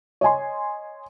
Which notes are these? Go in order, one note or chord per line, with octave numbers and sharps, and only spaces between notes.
C#5 D#5 G#5 C6